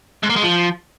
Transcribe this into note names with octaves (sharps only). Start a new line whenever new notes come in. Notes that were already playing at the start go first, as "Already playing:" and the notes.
G#2
A#3
G#3
F3